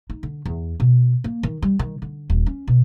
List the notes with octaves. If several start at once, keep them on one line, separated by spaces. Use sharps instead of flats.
D#4
D3
E2
B2
A#3
D#3
G3
D#3
D3
D#1
C#4
B2